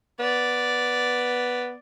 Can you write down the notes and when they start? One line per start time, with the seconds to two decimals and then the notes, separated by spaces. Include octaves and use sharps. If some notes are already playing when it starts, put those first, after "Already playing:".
0.20 B3 D5